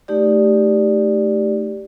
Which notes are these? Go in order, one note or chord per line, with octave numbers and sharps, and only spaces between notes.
A3 D#4 G4 D5